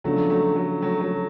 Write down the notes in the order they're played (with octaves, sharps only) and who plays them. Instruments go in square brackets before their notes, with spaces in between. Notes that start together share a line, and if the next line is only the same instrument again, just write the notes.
[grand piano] C#3 F3 B3 D4 F4 [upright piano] F#3 A3
[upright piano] F#3 A3
F#3 A3
F#3 A3
F#3 A3